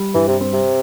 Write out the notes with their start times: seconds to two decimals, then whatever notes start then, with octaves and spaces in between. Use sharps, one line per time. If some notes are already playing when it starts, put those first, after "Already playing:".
Already playing: G3
0.15 G2 E3
0.28 C3
0.41 C4
0.54 C3